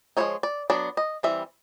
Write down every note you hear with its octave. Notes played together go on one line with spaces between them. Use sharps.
F3 G#3 C4 D#4 C#5
D5
F#3 B3 D4 D5
D#5
E3 G3 C4 E5